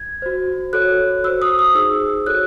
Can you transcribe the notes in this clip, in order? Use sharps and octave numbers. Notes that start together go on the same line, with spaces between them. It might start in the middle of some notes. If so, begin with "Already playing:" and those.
Already playing: G#6
F#4 C5
F#4 A4 C#5 F#6
F#4 C5 E6
D#6
D#6
D#4 G#4 C5 E6
F#4 A4 C#5 F#6